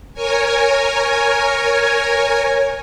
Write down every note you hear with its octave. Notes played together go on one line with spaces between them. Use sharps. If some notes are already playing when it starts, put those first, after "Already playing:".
A#4 C#5 G#5